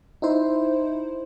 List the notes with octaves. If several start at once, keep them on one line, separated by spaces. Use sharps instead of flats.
D#4 E4 C5